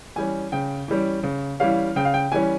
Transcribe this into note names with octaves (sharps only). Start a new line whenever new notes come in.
E3 G3 C#4 G#5
C#3 G5
E3 G3 C#4
C#3
E3 G3 C#4 F5
C#3 G5
F5
G5
E3 G3 C#4 G#5